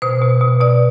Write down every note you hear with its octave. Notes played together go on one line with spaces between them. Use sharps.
B2 C5
B2
B2
B2 D5